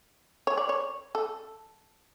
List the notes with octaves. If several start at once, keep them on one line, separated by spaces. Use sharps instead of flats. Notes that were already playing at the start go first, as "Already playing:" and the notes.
C#5
D5
C#5
A4